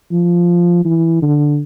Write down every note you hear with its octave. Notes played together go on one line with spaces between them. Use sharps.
F3
E3
D3